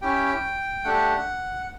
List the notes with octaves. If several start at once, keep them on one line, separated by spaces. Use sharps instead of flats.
C#4 E4 G4 G5
A3 D4 G4 F#5